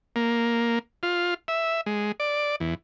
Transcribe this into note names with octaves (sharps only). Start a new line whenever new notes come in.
A#3
F4
E5
G#3
D5
E2